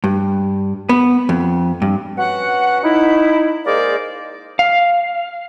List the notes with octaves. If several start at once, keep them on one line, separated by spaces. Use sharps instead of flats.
G2
B3
F2
G2
C#4 F#4 B4 F#5
D#4 E4
G#3 A#3 G#4 A#4 C5 D5
F5